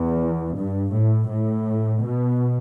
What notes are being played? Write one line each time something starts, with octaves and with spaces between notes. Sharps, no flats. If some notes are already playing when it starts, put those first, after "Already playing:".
Already playing: E2
G2
A2
A2
B2